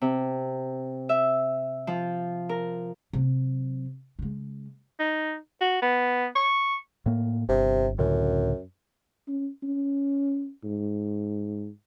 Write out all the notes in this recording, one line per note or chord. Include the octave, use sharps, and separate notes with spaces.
C3
E5
F3
A#4
C3 F#3
C#3 G#3
D#4
F#4
B3
C#6
A2 A#3
G1 C3
C#2 F#2 A2 D3
C#4
C#4
G#2